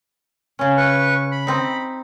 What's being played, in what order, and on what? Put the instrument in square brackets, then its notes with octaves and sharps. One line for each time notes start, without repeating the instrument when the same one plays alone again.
[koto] C#3 C#4
[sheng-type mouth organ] B4 C#6
B5
[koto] C4 D#4